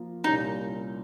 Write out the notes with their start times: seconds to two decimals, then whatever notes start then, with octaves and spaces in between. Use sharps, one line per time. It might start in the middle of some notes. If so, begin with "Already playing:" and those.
Already playing: F3 A#3 F4 A#4
0.24 C2 A#2 G3 C#4 D#4 F4